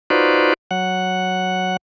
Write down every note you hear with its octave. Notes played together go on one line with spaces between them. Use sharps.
D#4 F4 F#4 B4 C5 D5
F#3 F#5